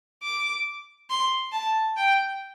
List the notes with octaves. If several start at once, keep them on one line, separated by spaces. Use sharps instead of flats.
D6
C6
A5
G5